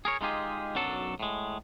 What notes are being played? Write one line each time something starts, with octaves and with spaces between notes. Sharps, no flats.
G#4 A#4 C#5
G#3 B3 D#4 F4 G4 G#4
B1 F#2 F#3 D4 A4
A2 G#3